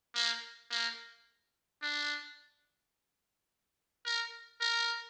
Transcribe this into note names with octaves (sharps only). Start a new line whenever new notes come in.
A#3
A#3
D4
A#4
A#4